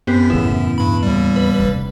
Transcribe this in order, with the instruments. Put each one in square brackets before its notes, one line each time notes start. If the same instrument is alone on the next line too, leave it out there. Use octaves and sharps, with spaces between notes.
[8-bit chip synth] F#2 [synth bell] B3 C4 [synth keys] G4
[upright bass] E2 A2 [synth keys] C#3 B3 [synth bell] E4
[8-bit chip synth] G2 B5
D#2 G3
[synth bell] B4
[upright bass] F1 [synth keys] A#1